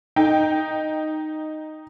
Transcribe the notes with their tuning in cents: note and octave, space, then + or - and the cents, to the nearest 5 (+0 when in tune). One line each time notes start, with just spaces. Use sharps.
D#4 -5 G5 +0